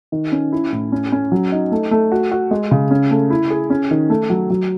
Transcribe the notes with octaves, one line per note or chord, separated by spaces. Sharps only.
D#3
C#4
E4
A2
C#4
C#4
F#3
D#4
A3
A3
F#4
F#4
G#3
C#3
C#4
A3
E4
G#4
C#4
D#3
A3
F#3
F#3